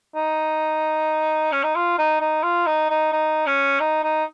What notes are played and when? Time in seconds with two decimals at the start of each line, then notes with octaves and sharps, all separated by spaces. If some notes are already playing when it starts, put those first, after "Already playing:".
0.16 D#4
1.52 C#4
1.63 D#4
1.76 F4
1.98 D#4
2.21 D#4
2.43 F4
2.66 D#4
2.90 D#4
3.12 D#4
3.46 C#4
3.80 D#4
4.04 D#4